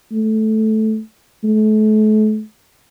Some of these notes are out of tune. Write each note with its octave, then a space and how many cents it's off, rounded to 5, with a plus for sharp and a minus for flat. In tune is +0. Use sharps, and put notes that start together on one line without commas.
A3 -10
A3 -35